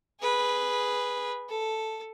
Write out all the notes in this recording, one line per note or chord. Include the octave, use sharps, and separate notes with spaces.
G#4 B4
A4